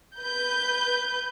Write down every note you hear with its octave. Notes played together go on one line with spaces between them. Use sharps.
B4 G6